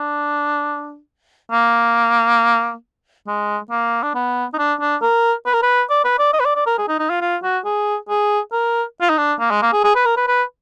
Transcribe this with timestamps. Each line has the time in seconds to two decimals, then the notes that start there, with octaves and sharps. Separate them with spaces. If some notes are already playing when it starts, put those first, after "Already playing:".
Already playing: D4
1.52 A#3
3.27 G#3
3.70 A#3
4.03 D4
4.14 B3
4.54 D#4
4.58 D4
4.80 D4
5.02 A#4
5.46 B4
5.54 A#4
5.62 B4
5.90 D5
6.04 B4
6.19 D5
6.33 D#5
6.40 B4
6.45 D5
6.56 D5
6.66 A#4
6.78 G#4
6.88 D#4
6.99 D#4
7.10 F4
7.21 F4
7.43 F#4
7.65 G#4
8.09 G#4
8.52 A#4
9.01 F4
9.09 D#4
9.18 D4
9.40 A#3
9.51 G#3
9.62 A#3
9.73 G#4
9.84 G#4
9.95 B4
10.05 A#4
10.17 B4
10.27 B4